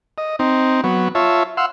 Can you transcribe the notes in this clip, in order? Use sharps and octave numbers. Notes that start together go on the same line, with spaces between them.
D#5
C4 D#4
F#3 B3
F4 C#5 E5 A5
F5 F#5 C6 E6